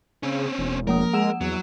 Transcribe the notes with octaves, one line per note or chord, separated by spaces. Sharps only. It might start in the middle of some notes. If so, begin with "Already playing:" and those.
C#3 C4 C#4
E1
F3 A#3 A#4 D#6
G#3 F#5 E6 E7
E2 F#3